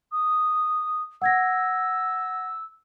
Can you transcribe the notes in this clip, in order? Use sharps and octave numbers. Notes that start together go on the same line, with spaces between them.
D#6
F#5 E6 G#6 A#6